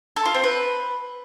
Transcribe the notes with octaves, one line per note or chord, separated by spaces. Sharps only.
A4
F4
C4
B4